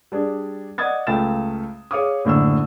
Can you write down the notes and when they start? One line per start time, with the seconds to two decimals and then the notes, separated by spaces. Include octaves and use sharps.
0.12 G3 D4 G#4
0.78 D5 D#5 F#5 D#6 G#6 A6
1.07 C#2 A3 F5 G5 A6 E7
1.91 G#4 C#5 F5 D6 D#6
2.25 F#1 A2 D3 E6